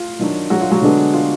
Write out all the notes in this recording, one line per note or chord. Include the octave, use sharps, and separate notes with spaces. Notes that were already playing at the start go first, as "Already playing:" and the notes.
Already playing: F4
D#3 F#3 D4
F#3 F#4
F4
F#3 F#4
D3 G#3 B3 D4
F4